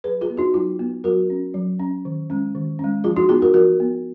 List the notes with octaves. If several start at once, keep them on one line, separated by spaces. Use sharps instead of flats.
F#3 G#4 B4
F4 G#4
B3
D#4 F#4
F#3 F4
B3
F#3 F#4 A#4
C#4
F#3
C#4
D#3
G#3 C#4
D#3
G#3 C#4
F3 F4 G#4
D#4 F#4
B3 F4 G#4
F#4 A#4
F3 F#4 A#4
B3